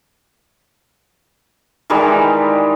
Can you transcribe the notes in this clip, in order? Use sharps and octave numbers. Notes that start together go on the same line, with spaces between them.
D#3 E3 G3 G#3